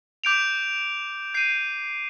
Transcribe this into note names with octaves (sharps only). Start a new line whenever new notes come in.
D6 G6 D7 F7
G6 C7 D#7